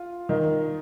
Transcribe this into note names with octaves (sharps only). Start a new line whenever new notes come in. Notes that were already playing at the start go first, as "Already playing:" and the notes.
Already playing: F4
D#3 D#4